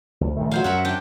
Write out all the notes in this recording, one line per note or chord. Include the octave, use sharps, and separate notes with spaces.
D2
A#1 D#3 A3
F#3 C5 F5
F#2 A#4 E5 F#5
D4 G5